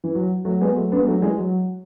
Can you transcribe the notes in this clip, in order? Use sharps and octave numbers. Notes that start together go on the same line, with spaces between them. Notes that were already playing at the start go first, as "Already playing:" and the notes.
E3
F#3
F#3 A3
G#3 B3
F#3 A3
B3 D4
G#3
F#3 A3
E3 G#3
F#3